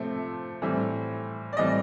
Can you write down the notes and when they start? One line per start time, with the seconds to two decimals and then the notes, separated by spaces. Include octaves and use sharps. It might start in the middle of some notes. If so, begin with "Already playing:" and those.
Already playing: C3 F3 A3 C4
0.62 A2 E3 G3 C4
1.53 D5
1.57 A2 E3 G3 C4 D#5